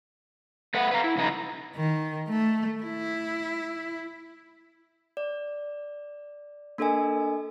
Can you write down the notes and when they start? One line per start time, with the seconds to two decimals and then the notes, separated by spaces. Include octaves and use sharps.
0.74 A3 B4 F#5
0.92 B4 F5 A#5
1.04 E4
1.17 C#3 F3 D#4 B4 A#5
1.76 D#3
2.29 A3
2.83 E4
5.17 D5
6.78 A#3 D4 A4 A#4 D#5 G#5